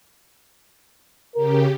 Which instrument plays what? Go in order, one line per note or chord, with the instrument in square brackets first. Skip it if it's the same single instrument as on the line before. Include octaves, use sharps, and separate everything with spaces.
[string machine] C#3 G4 [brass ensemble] A#4